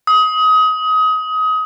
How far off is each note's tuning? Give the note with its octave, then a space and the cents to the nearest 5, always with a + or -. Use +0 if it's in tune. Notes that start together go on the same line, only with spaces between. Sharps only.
D#6 +25